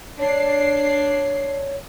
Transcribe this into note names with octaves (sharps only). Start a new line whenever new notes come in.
D4 C#5 C7